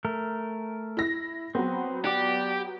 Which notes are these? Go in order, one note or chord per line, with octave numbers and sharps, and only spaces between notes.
A3 A#4
E4 A#6
F#3 B3 C4
G4 D5 F#5